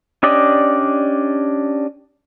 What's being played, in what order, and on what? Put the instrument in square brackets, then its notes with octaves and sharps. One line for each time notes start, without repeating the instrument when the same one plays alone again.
[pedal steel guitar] C#4 D4 G4 D5 D#5